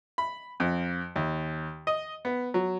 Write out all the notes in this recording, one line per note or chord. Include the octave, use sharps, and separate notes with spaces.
B5
F2
D#2
D#5
B3
F#3